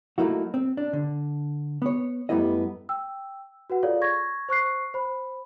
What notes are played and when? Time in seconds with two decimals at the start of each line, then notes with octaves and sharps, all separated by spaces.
0.18 F#3 A3 A#3 D#4 E4 F#4
0.54 C4
0.77 D4
0.93 D3
1.82 B3 C#5
2.29 F#2 G3 A3 B3 E4 D#5
2.89 G5 E6
3.70 F#4 B4 F#5
3.83 F4 G#4 A4 C#5 D5 F5
4.02 C#6 G#6 A#6
4.49 C5 C#6 F#6 C7
4.94 C5 B5